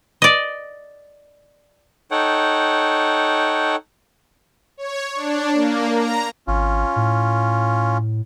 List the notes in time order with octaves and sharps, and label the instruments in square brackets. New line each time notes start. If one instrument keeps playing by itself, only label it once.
[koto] D5 D#5
[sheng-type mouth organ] D#4 A4 C#5 F#5 G5
[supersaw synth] C#5
D4
A#3
A#5
[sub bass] G#1 [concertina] C#4 F4
[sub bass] A2